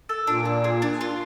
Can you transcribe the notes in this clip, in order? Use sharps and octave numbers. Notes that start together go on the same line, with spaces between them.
A4
A#2 D4
D4
G#4
D4
F4